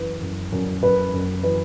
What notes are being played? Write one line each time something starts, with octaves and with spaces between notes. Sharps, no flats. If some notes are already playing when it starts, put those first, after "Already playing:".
Already playing: F#2 E3 B4
F#2
F#2
F#2 B4
F#2
E3 B4